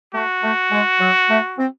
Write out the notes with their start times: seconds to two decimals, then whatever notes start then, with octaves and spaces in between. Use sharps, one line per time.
0.14 A3 F#4
0.43 A3
0.72 G#3
1.00 F#3
1.29 A3
1.58 C4